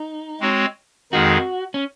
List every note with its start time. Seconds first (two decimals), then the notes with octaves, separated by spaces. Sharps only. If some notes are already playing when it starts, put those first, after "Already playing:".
Already playing: D#4
0.40 G#3 C4 F#4 C#5
1.12 F2 D#3 G#3 D#4 F#4 G#4
1.74 C#4